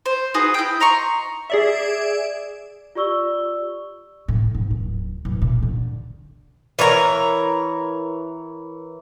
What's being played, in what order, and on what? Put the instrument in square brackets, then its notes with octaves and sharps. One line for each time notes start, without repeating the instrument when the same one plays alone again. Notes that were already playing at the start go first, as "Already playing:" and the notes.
[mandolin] C5
D#4 F#4 G#4 B4
E4 G5
D#5 A#5 C6 C#6
[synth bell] G#4 D5 E5
[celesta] F4 G4 D5 C#6 E6 G7
[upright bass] A2
G#2
D1
D1
A#2
D3
[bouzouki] E3 A#4 C#5 A#5